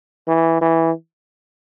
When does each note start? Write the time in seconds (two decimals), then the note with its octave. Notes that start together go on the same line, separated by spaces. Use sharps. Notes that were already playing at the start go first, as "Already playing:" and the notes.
0.28 E3
0.61 E3